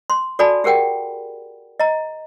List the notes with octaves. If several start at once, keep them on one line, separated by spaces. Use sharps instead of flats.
C6
F#4 A4 D5 G#5 A5 B5
G4 G#4 A#4 F#5 G5
D#5 A#5